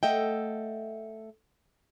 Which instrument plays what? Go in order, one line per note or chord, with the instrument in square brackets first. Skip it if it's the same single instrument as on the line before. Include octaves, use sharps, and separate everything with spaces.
[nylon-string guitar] A3 A4 D#5 E5 F#5 G5